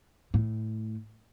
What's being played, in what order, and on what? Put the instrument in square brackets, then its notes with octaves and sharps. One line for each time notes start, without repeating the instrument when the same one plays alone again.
[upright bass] A2